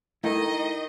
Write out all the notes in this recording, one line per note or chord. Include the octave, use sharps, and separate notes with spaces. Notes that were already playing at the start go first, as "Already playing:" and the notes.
D#3 A3 E4 D#5